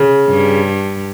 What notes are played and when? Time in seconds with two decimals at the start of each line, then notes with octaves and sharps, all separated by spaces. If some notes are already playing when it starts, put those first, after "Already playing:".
Already playing: C#3
0.28 G2